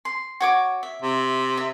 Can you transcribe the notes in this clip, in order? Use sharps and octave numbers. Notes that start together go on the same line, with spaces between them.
C6
F#4 C#5 D6
E5
C3
E5